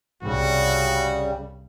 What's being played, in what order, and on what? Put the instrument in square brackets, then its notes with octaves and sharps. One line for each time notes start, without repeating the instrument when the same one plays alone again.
[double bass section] C2 G2 [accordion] C#3 G3 [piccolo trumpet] F#4